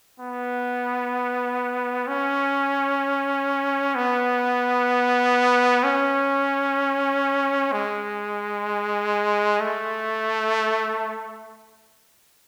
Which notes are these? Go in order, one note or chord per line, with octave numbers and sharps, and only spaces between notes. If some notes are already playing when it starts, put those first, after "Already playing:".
B3
C#4
B3
C#4
G#3
A3